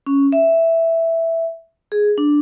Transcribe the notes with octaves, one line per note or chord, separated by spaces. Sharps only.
C#4
E5
G#4
D4